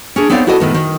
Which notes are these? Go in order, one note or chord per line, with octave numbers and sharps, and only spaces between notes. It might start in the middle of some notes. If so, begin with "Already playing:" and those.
C#4 D4 G#4
B3 C4 D#4 C#5 D5 F5
E4 F#4 A4 D5 D#5
A2 D#3 B3
D#3